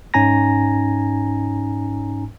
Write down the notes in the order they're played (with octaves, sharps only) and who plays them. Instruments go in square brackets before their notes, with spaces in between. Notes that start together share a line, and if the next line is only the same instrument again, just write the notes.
[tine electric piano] G#2 C#4 D#4 G#5 A#5 A#6